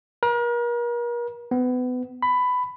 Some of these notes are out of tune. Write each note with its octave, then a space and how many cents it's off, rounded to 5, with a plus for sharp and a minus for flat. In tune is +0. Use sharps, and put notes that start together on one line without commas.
A#4 +40
B3 +25
B5 +15